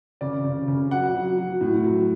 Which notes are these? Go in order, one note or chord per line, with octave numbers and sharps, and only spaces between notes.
C#3 D5
C#3
C#3
F#3 F#5
F#3
F#3
A2
F#3